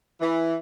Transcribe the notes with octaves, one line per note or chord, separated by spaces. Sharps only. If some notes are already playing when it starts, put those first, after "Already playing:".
E3